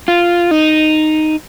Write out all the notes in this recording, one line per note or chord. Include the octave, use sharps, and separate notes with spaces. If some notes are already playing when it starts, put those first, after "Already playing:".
F4
D#4